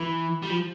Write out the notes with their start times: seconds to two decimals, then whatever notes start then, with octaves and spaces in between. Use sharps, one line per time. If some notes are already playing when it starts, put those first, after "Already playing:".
Already playing: E3
0.43 G3
0.50 F3